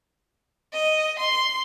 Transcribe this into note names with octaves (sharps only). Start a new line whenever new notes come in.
D#5
C6